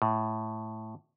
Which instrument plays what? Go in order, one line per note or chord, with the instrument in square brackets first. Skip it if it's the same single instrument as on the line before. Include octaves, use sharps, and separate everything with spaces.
[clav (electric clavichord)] A2